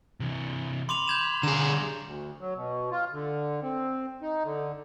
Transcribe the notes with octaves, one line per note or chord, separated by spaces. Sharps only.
C3 E3
B5 C6 D6 F7
G6 G#6 E7
D3 G3 G#4 A#5 E7
D2
F#3
B2
F4
D3
C4
D#4
D3